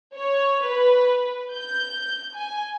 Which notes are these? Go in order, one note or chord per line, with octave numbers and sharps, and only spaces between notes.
C#5
B4
G6
G#5